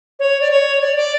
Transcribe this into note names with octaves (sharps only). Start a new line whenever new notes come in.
C#5
D5
C#5
D5
D5